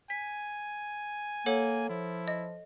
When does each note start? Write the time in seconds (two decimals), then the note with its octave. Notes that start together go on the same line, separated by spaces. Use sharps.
0.10 G#5 B6
1.46 A#3 A4 C#5 F#5
1.89 F3 E4
2.28 D#5